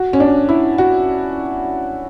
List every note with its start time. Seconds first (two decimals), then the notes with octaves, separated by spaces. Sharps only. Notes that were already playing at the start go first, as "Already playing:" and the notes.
Already playing: F#4
0.13 C#4
0.20 D4
0.49 E4
0.78 F#4